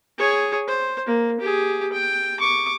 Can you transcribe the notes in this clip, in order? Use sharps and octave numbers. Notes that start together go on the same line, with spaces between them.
G#4 C#5
C5
A#3
G4 G#4
G5
C#6 D6